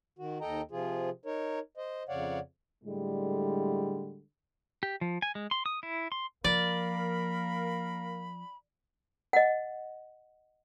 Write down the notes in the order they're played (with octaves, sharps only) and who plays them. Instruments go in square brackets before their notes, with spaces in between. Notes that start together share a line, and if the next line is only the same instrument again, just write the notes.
[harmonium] D#3 F#4
D#2 A4 D#5 G5 A#5
C3 F3 F4 G#4
D#4 A#4 C#5
C5 D#5
F2 C#3 C#5 D5 F5 F#5
[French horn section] A2 D3 G3 G#3
[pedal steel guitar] G4
F3
G#5
G#3
C6
D#6
E4
C6
[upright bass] F3 [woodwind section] A#3 A#4 F5 [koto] D5 [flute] B5
[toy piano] D#5 F#5